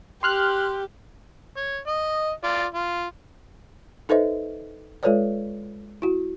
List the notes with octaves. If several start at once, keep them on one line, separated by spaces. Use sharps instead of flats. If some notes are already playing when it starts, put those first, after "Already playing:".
G4 C6 F6 F#6
C#5
D#5
F4 D5
F4
D#4 A4 B4 C5 D#5 E5
G#3 F4 A4 B4 C#5 D5
E4 F#4